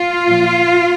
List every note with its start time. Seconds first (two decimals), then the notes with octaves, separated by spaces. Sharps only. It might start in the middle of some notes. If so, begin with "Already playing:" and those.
Already playing: F4
0.26 A#2 F3